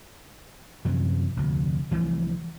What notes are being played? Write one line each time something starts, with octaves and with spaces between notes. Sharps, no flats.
F#2 C3 E3 F3
F1 D2
C2 E3 F3 A3